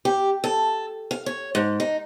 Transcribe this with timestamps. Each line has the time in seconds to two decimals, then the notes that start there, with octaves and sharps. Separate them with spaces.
0.05 G4
0.44 A4
1.11 F5
1.26 C#5
1.55 G#2
1.80 D#4